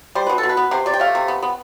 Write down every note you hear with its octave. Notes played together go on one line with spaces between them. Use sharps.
G3 C5
B2 B4
A4
B2
B4
B3
C3 C5
C3 D5
G5
A3 F5
C3
B3
B3